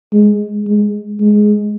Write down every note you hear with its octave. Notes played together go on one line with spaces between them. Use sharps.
G#3
G#3
G#3